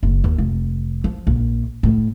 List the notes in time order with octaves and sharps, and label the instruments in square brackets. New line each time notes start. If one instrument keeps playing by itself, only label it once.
[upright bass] F#1
D#2
F1
F3
A#1
A2